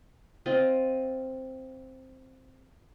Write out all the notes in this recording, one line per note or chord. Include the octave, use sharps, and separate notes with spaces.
C4 F4 D#5